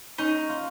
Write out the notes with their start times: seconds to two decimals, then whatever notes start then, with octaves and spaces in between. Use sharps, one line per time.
0.18 C#4 D#4
0.49 F4